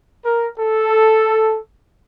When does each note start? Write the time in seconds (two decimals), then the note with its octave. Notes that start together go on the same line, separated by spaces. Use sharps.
0.24 A#4
0.59 A4